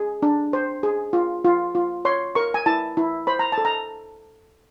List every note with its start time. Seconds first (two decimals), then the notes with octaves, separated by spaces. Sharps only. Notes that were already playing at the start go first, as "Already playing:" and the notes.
Already playing: G#4
0.22 D4
0.53 C5
0.83 G#4
1.13 F4
1.45 F4
1.75 F4
2.05 C#5 C6
2.35 A#4 C#6
2.54 G#5
2.66 E4 A5
2.97 E4
3.27 C5 B5
3.39 A#5
3.52 A5
3.58 A4
3.65 A#5